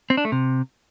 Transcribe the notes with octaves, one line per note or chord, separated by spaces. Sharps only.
C4
D4
A3
C3